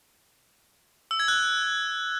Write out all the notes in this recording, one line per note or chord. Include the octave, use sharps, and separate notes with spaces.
E6
G#6
F#6